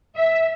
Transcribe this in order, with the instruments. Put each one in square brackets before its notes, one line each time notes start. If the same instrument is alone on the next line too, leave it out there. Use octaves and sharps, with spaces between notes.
[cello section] E5